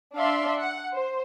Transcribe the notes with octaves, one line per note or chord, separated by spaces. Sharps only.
D4 D5 E5 F5 C6
F#5
C5